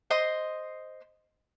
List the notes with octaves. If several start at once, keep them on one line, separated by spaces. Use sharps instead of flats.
C5 D#5 C6